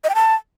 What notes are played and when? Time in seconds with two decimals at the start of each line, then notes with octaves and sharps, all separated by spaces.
0.04 D#5
0.09 G5
0.15 A5